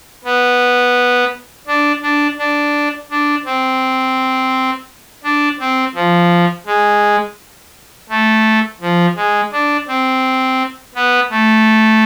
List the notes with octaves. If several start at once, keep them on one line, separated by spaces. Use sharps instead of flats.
B3
D4
D4
D4
D4
C4
D4
C4
F3
G#3
A3
F3
G#3
D4
C4
B3
A3